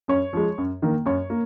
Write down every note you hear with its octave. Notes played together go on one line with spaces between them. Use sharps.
F#2 C#5
F3 G#3
F#2
D#3 A#3
F#2 C#5
A#3